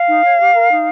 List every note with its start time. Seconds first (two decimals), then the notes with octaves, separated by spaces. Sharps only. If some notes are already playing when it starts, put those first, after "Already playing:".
Already playing: F5
0.09 D#4
0.24 C#5
0.39 G4
0.55 A#4
0.70 D#4